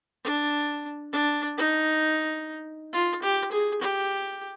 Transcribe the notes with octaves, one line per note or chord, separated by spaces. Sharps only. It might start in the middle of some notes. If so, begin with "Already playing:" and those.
D4
D4
D#4
F4
G4
G#4
G4